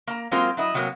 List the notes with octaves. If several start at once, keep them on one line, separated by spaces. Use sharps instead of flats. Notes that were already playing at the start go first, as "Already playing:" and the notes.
A#3 A#5
F#3 G#3 A#3 C4 F4
F#3 E4 D#5
C3 F#3 A#3 B3